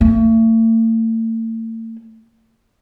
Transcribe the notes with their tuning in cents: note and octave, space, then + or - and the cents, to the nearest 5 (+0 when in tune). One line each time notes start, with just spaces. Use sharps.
A3 +45